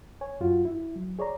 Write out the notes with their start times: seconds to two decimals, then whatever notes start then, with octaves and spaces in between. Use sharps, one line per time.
0.21 C#5 G#5
0.41 F#2 F4 F#4
0.65 E4
0.96 F#3
1.19 G#4 C#5 D5 A#5